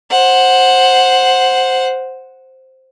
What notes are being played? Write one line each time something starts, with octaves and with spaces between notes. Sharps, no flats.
C5 F#5